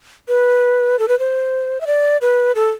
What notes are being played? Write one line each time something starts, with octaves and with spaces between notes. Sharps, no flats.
B4
A4
B4
C5
E5
D5
B4
A4